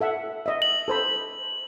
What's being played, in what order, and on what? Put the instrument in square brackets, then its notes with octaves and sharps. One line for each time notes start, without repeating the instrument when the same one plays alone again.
[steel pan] A4 E5 F#5
D#5 E5
[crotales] F#7
[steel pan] A4 C5 B5